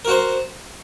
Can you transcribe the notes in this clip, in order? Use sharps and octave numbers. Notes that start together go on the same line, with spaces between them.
F#4 A#4 C5